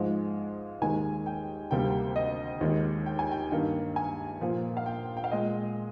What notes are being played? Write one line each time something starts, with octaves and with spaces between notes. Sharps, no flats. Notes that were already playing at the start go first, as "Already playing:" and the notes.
Already playing: G#2 F3 G#3
D#2 D#3 G#3 G#5
G5
D2 C3 G3 A#3 G5
D#5
D#2 D#3 G#3
G5
G#5
G5
G2 D#3 A#3
G#5
A#2 F3 A#3
F5
G5
G5
F5
A#2 G#3 D#5